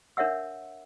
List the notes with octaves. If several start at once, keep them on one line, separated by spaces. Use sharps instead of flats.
D4 A#4 C#5 E5 F#5 E6